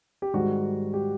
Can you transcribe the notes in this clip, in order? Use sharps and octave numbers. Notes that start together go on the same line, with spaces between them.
G4
G#2 D#3 G3 F#4
G4